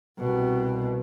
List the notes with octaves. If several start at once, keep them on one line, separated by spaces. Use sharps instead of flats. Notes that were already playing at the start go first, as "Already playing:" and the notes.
C2 B2